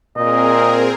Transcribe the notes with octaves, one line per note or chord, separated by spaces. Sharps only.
A#2 C4 G#4 A#4 D#5